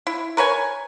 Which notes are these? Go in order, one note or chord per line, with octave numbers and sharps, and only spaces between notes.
E4
A#4 B4 C#5 G#5